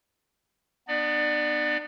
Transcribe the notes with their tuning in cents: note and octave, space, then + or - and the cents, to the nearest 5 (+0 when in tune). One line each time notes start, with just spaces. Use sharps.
B3 +0 D4 +45 D5 +25